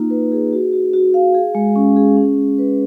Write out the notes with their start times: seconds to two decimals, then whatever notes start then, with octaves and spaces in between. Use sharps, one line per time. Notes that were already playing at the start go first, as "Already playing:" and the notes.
Already playing: A#3 D#4 F4
0.10 B4
0.32 G#4
0.53 F#4
0.73 F#4
0.93 F#4
1.14 F5
1.34 G#4
1.55 G#3
1.76 C#4
1.96 G#4
2.17 C#4
2.37 G#3
2.58 B4